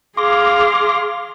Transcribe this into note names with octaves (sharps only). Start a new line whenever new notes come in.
G#4 F5 C6 D6 A#6